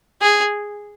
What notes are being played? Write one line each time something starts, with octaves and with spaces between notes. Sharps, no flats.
G#4